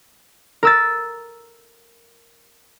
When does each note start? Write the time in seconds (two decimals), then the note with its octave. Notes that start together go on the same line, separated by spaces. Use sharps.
0.63 A#4 E6 A6